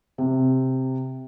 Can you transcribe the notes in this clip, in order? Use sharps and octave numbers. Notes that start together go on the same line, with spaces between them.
C3